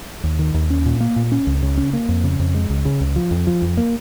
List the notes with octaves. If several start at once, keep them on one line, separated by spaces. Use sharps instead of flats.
D#2
D#3
D#2
C#4
A#2
A#3
A#2
C#4
C#2
C#3
C#4
A#3
F2
C#3
F2
G#3
C#2
C#3
C#2
F3
F2
F3
F2
A#3